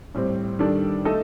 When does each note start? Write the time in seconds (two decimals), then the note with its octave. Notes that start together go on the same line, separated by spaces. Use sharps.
0.14 A2 G3 C4
0.59 D#3 G3 D4 A4 D5
1.05 A3 D#4 A4 D#5